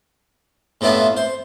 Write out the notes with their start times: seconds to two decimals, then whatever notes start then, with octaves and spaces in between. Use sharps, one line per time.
0.81 A2 C3 B3 D4 E4 F4
1.17 C5